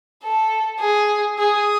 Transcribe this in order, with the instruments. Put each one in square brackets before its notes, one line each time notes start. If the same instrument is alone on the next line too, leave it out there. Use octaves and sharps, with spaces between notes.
[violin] A4
G#4
[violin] G#4 [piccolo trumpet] D#6